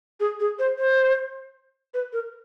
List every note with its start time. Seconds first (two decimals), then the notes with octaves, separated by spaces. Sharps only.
0.20 G#4
0.40 G#4
0.59 C5
0.78 C5
1.94 B4
2.13 A#4